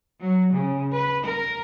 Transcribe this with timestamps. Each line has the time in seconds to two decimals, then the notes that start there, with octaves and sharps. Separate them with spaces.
0.20 F#3
0.54 C#3
0.92 B4
1.23 A#4